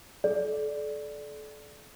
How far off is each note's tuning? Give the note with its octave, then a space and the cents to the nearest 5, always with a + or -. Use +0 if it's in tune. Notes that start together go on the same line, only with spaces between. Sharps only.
A4 -35 D5 +0